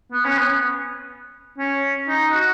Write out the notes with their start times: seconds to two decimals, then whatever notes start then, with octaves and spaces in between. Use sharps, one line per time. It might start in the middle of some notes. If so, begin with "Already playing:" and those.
0.12 B3
0.25 C#4
0.39 B3
1.58 C#4
2.08 D#4
2.32 F#4